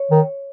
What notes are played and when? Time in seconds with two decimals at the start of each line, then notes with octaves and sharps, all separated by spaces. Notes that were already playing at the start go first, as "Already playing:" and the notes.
Already playing: C#5
0.11 D#3